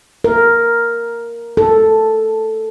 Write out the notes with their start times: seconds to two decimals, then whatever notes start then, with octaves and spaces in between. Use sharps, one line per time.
0.24 A#4
1.57 A4